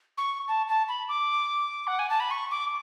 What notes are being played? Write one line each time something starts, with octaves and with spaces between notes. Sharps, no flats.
C#6
A5
A5
B5
D6
F#5
G#5
A5
B5
C#6
D6